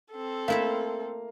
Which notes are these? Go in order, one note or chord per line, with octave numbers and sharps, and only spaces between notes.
C4 A4
A3 A#3 E4 E5 F5